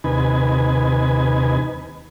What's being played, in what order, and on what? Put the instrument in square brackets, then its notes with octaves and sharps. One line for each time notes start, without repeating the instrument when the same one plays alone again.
[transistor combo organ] D#2 C3 D#4 B4 G#5